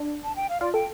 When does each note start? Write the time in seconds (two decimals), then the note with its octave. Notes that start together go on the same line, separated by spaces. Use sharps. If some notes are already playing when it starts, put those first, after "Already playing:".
Already playing: D4
0.24 A5
0.36 G5
0.49 F5
0.61 F4 D5
0.74 A4 G5